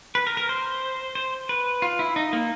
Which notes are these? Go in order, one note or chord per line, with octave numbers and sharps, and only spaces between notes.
B4
A#4
A#4
C5
C5
B4
F4
E4
D#4
A#3